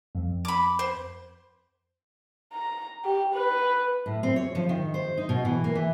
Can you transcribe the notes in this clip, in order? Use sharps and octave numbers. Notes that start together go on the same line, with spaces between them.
F2
B5 D6
C5
A#5
G4
B4
A2
C4
C#5
F3
D#3
C5
D#4
B2
E3
A#3
E3